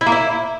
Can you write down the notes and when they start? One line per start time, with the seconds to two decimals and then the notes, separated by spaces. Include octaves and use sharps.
0.01 E4
0.06 A#3
0.12 E4